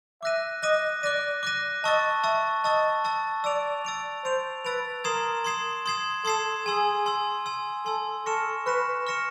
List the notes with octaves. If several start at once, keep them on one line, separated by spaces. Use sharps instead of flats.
E5 D6 F#6 A#6 D#7
D#5 D6 F#6 A#6 D#7
D5 D6 F#6 A#6 D#7
D6 F#6 A#6 D#7
D#5 A5 C#6 E6 A6
E5 A5 C#6 E6 A6
D#5 A5 C#6 E6 A6
A5 C#6 E6 A6
D5 E6 A6 D7 F7
E6 A6 D7 F7
C5 E6 A6 D7 F7
B4 E6 A6 D7 F7
A#4 C6 D#6 G#6 C7 E7
C6 D#6 G#6 C7 E7
C6 D#6 G#6 C7 E7
A4 C6 D#6 G#6 C7 E7
G#4 G#5 C6 E6
G#5 C6 E6
G#5 C6 E6
A4 G#5 C6 E6
A4 C#6 F6 A#6 C#7 E7
B4 C#6 F6 A#6 C#7 E7
C#6 F6 A#6 C#7 E7